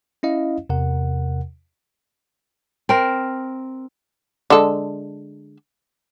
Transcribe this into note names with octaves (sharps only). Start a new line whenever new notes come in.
C#4 E4 D#5 F5
E2 C3 A#4 F#5
C4 A#4
D3 G#3 A4